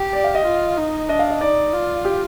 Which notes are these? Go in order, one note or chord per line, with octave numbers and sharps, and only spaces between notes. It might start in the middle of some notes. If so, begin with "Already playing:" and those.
Already playing: G4
D5
F5
D#5
F4
D#4
D4 D#5
F5
D#5
D#4 D5
F4
G4